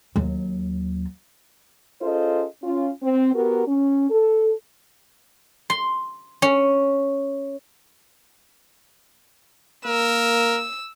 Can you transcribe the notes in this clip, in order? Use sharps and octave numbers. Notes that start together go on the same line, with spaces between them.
D#2 F#3
C#4 F4 G#4 A4 C5 D#5
C#4 F4
C4
B3 F#4 G4 A#4
C#4
A4
C6
C#4
A#3 A#4 E6